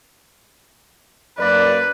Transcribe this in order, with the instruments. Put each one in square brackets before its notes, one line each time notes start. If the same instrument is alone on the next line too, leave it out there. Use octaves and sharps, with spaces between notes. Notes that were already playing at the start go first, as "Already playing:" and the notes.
[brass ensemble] F#2 A#3 D5 [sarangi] B4